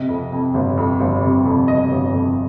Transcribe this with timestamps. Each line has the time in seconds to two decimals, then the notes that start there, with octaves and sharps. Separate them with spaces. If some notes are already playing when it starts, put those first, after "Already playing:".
Already playing: C3 D#5
0.09 F2
0.32 F2
0.54 G1
0.78 F2
1.00 G1
1.23 C3
1.46 F2
1.68 G1 D#5
1.91 G1
2.13 F2